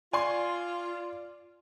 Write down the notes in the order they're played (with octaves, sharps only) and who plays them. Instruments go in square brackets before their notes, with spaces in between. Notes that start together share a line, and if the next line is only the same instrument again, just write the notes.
[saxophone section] F4 [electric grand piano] D5 [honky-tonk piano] G#5 C6